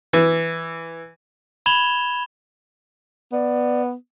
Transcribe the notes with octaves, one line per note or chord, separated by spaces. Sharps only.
E3
B5 G#6 E7 F7 G7
B3 D5